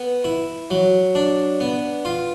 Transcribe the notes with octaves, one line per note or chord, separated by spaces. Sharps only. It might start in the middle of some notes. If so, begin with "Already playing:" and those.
Already playing: B3
E4
F#3
D4
B3
F4